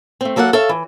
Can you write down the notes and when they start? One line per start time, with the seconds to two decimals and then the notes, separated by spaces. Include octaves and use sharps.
0.21 A3 C4
0.36 F#3 A#3 A4 A#4 F#5
0.53 A4 C#5 E5 F5
0.69 E3